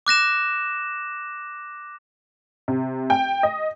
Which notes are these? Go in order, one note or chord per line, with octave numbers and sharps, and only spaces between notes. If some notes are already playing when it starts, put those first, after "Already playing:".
D6 F#6 A#6 E7
C3
G5
D#5